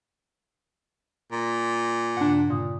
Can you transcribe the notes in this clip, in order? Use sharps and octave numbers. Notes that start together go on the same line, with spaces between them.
A#2
G2 C#3 D4 F#5
A#2 D3 D#6